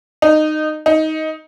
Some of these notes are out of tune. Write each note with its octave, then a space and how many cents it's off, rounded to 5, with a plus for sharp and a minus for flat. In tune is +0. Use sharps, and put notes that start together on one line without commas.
D#4 -15
D#4 +15